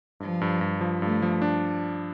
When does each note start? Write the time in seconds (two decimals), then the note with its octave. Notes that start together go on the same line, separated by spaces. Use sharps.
0.20 G2 F3
0.41 G2
0.61 G2
0.81 F3
1.02 G2 A3
1.22 F3
1.42 D4